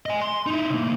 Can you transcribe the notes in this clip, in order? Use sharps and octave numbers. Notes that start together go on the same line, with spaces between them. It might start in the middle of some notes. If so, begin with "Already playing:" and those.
D#5 G#5
C6
D#4 E4
C2 A#3